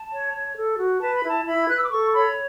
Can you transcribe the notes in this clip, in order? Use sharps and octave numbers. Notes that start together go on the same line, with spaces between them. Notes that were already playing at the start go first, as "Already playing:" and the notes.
Already playing: A5
C#5
C#5
A4
F#4
B4 A5
B5
E4 A5
E4 B5
B4 F#6
E6
D6
A4 C#6
C#5 B5